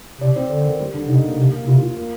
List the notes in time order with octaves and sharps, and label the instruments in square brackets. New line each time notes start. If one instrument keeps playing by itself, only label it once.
[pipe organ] C3 [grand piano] D5
[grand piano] C4
[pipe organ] D3 [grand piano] D5
[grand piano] A#4
G3
D3
[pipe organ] C3 [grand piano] D#4
[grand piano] A#3
[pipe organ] C3 [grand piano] A#3
[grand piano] A#3
[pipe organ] C3 [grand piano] F4
[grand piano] F4
A#3